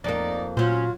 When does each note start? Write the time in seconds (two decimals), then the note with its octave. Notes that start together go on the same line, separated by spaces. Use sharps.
0.04 F2 A#3 D#4 D5
0.57 A#2 F#3 C#4 F4 C5